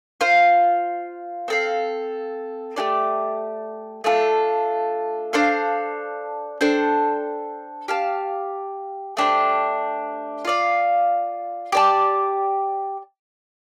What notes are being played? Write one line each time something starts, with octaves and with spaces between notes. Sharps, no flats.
F4 C5 F5
C4 A4 F5
A3 D4 G4 D5
A3 D4 F4 A4
D4 A4 C5 F5
D4 A4 C5 G5
G4 F5 A5
A3 D4 G4 C5
F4 D5 F5
G4 D5 A5